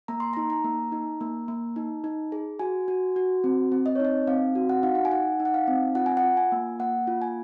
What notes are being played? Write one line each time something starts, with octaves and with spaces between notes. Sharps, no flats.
A#3 A#5
C6
D#4 A#5
A#5
A#3
D#4
A#3
A#3
D#4
D#4
G#4
F#4 G#5
F#4
F#4
C4
C4
D#5
C#5
D#4 D#5
C4 F5
F#4
F#5
D#4 F5
F#5
G#5
D#4 F#5
D#4
F#5
F5
C4
F4 F#5
G#5
F#5
F4
G#5
A#3
A#3 F#5
F4
G#5